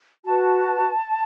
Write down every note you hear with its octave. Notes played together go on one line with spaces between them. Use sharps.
F#4 B4 A5